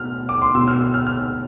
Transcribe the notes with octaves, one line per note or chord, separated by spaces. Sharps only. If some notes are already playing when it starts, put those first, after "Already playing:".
Already playing: B2 F6
D6
C6
B2 E6
F6
E6
F6
F6